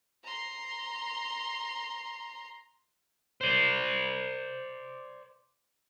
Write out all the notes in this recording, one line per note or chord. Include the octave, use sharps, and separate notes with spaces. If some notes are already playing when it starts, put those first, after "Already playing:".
A#5 C6
C5 D5